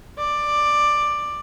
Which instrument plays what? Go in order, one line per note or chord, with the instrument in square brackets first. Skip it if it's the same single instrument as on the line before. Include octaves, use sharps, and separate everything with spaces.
[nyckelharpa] D5